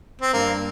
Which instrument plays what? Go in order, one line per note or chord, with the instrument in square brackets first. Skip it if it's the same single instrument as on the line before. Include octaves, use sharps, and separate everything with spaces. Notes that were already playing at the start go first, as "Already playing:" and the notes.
[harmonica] C4
[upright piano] G2 [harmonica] A#3